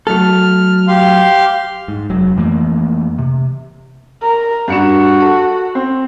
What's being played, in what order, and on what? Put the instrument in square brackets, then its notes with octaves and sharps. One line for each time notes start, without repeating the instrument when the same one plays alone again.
[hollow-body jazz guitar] F#3 A3 A4 [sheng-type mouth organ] F6
[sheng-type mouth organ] G4 F5 C6
[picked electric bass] G#2
F1 F#3
F2 E3 A3 A#3
C3
[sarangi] A#4
[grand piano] G2 C#7 E7 [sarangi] F#4
[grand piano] A4
C4